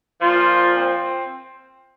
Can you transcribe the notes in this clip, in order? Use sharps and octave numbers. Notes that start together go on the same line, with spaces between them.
A#2 F3 F4
C4